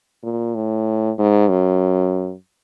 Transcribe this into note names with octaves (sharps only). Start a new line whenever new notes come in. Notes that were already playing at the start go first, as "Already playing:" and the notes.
A#2
A2
G#2
F#2